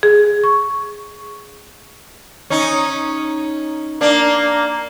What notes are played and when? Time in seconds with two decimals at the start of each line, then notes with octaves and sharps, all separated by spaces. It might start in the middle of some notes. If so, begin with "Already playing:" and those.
0.03 G#4
0.44 C#6
2.50 C#4 D#4
4.01 A#3 D4